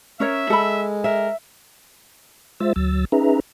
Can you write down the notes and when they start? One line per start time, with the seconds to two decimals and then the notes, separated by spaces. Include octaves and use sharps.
0.20 C#4 A#4 C#5 E5
0.50 G#3 A4 B5
1.04 A#4 E5
2.60 G#3 F4 C5 E5 E6 A6
2.76 D2 F#3 E6 A6
3.12 C#4 D#4 G#4 B4 E5 A#5